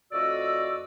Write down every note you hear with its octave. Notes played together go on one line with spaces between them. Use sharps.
F2 A2 F#4 D5 D#5 E6